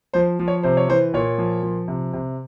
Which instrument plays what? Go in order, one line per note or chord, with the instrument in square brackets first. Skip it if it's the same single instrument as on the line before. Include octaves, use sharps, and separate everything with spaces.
[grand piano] F3 C5
F3
C#5
C3 C5
C#5
E3 C5
A#2 C#5
F3
F3
C3
C3